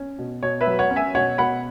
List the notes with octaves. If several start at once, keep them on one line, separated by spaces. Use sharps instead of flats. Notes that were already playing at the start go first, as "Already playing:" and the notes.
Already playing: C#4
B2
B2 C#5
B4 E5
F#3
C#5 F#5
C#4
E5 G#5
B2 C#5 F#5
B2 F#5 B5